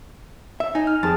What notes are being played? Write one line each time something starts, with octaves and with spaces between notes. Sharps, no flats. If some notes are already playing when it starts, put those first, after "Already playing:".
E5
D#4 G#5
F6
F2 G#4 A5 A6